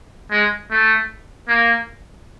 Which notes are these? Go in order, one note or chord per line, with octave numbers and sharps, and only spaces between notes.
G#3
A3
A#3